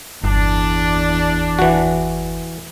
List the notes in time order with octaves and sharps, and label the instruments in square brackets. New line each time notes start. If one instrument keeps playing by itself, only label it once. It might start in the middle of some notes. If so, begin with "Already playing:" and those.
[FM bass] G1 [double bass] E2 [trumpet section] D4
[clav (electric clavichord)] E3 F#4